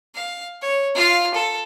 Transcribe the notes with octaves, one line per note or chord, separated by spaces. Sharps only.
F5
C#5
F4 F5
A4